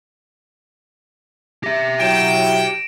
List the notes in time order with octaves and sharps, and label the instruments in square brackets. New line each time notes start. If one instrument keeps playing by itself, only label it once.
[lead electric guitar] G4 E5 [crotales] A#6
[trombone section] F#3 E4 [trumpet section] G5 [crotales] D7 E7